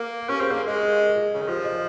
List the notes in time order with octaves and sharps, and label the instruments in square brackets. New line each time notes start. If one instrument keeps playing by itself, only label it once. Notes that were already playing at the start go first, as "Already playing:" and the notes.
Already playing: [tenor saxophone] A#3
[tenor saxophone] C#4 [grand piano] G4
[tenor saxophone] C4 [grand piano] G#4
[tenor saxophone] A#3 [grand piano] A#4
[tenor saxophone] G#3
[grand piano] A#4
G#4
[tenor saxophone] C#3
D#3
[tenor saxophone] F3 [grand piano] G4
[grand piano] G#4
D#5
C5